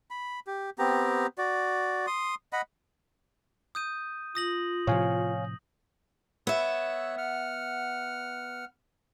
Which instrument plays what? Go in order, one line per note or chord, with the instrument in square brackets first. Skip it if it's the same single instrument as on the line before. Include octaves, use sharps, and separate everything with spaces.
[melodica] B5
G4
B3 C4 G4 A#5
F#4 D5
C6 D#6
D#5 F#5 B5
[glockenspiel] D#6 G6 D#7
[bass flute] F4 [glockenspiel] D#6 A#6 F#7
[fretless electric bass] A2 C3 F3 [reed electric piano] C#5 F5 G#5
[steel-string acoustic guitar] B3 E5 [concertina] C#5 E6 F#6
[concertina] F#5 F6